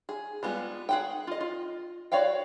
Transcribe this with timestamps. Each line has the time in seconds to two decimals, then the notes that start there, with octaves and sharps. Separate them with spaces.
0.09 G#4
0.43 G3 G#3 B3 F4
0.89 G#4 F#5 G5
1.27 F4 D#5
1.41 F4
2.12 F#4 C#5 D5 F5 G5